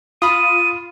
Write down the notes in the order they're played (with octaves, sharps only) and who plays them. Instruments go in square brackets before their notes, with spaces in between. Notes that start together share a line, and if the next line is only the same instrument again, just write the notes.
[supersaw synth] F4 [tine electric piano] B5 D#6 [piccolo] D#7